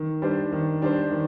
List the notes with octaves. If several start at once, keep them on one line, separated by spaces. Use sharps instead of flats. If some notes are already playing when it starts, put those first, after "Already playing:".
Already playing: D#3
G3 D4 G4 C5
D#3
G3 D4 G4 C5
D#3